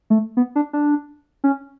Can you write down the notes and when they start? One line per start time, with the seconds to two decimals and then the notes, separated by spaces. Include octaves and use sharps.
0.10 A3
0.37 B3
0.56 D4
0.73 D4
1.44 C#4